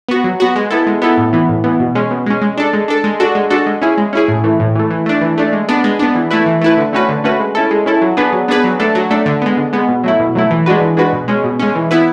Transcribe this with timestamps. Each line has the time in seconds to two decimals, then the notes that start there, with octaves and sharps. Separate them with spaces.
0.09 B3 F#4
0.24 F#3
0.40 B3 F#4
0.56 G#3
0.71 B3 E4 A4
0.87 G#3
1.02 B3 E4 A4
1.17 A2
1.33 E3 B3
1.49 A2
1.64 E3 B3
1.80 B2
1.95 G#3 C#4
2.11 B2
2.26 G#3 C#4
2.41 G#3
2.57 D4 A4
2.73 G#3
2.88 D4 A4
3.04 G#3
3.20 D4 F#4 A4
3.35 G#3
3.50 D4 F#4 A4
3.66 G#3
3.82 C#4 E4 G#4
3.98 G#3
4.13 C#4 E4 G#4
4.28 A2
4.44 E3 A3
4.60 A2
4.75 E3 A3
4.90 E3
5.06 A3 D4
5.22 E3
5.38 A3 D4
5.53 G#3
5.69 B3 D4
5.84 G#3
5.99 B3 D4
6.15 E3
6.31 A3 E4 B4
6.46 E3
6.61 A3 E4 B4
6.78 D3
6.93 A3 C#4 F#4 B4
7.09 D3
7.24 A3 C#4 F#4 B4
7.40 G#3
7.55 C#4 E4 A4
7.71 G#3
7.86 C#4 E4 A4
8.02 F#3
8.17 B3 D4 G#4 B4
8.33 F#3
8.48 B3 D4 G#4 B4
8.64 F#3
8.79 A3 D4 A4
8.95 F#3
9.10 A3 D4 A4
9.26 D3
9.42 G#3 B3
9.57 D3
9.73 G#3 B3
9.88 B2
10.04 F#3 A3 E4
10.19 B2
10.35 F#3 A3 E4
10.51 E3
10.66 G#3 D4 F#4 B4
10.82 E3
10.97 G#3 D4 F#4 B4
11.13 B2
11.28 G#3 C#4
11.44 B2
11.59 G#3 C#4
11.75 E3
11.91 B3 E4 B4